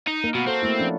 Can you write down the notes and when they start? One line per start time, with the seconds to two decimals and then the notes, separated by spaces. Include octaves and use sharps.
0.07 D#4
0.24 A#3 A#4
0.35 B2 F#4
0.48 C4 A4
0.62 A3 A#3 E4
0.79 F3 C#4 D4